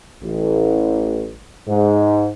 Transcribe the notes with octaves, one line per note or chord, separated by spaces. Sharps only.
A1
G#2